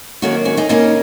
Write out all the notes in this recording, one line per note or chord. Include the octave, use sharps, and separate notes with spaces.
F#2 D#3 A#3 C#4 F#4
C#4 F#4
D#4 G#4
C#3 A#3 C#4 D#4 G#4